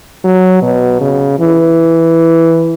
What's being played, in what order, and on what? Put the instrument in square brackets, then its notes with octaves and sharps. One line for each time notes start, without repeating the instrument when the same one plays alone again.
[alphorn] F#3
B2
C#3
E3